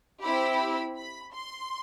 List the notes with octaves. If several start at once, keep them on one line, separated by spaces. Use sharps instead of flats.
C4 E4 G4 B5
B5
C6